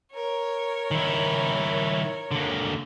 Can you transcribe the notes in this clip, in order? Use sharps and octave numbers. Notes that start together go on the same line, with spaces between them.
A#4 C#5
D#3 E4
D3 A#3